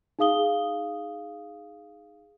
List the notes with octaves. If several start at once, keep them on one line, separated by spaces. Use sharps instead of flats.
D#4 G#4 F5 D#6 G7